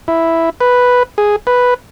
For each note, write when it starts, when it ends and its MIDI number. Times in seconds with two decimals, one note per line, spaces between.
0.08 0.50 64
0.61 1.03 71
1.18 1.36 68
1.47 1.74 71